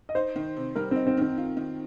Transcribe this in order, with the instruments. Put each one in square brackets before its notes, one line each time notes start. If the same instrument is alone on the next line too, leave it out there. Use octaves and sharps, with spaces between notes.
[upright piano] D#5
[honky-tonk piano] D#4 [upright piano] C5
[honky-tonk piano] D#3
C3
[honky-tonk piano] G3 [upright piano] A#4
[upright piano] C4
[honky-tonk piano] D#4
[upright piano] C4
[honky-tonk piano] D#3 [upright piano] C4
[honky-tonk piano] F4
D#3